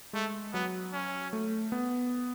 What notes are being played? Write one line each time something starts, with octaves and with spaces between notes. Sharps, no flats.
G#3 A3
F#3 B3
C#4
A3
B3